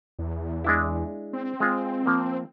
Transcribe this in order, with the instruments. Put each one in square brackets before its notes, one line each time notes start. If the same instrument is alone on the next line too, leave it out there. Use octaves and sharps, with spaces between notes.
[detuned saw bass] E2
[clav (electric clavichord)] G#3 D4 E4
[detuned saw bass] C4
[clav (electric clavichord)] G#3 F4
F3 A#3